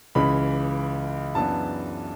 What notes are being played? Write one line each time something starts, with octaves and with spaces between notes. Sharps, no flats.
C#2 C#3 E3 B5
F#2 E3 B3 D4 A5